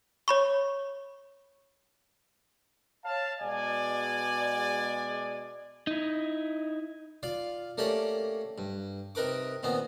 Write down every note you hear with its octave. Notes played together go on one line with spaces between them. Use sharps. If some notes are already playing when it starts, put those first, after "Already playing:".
C#5 B5 C#6
C#5 F5 A5
B2 G#3 D5 G#5
D#4 E4
F4 D5 F5
A3 A#3 C#4 G4 D5
G2
C3 D#4 A#4 B4 D6
A#2 D#3 B3 C4